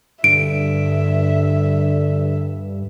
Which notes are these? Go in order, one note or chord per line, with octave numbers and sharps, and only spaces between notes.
G2 D3 E5 D7